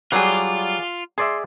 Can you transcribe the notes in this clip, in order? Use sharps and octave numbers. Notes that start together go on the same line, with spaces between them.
F#3 G3 F4 G#4 D5 F#5
G#4 D5 E5 C6